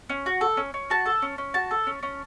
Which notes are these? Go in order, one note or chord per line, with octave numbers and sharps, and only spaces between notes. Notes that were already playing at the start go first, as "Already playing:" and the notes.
C#4
F#4
A4
C#4
C#4
F#4 A5
A4
C#4
C#4
F#4 A5
A4
C#4
C#4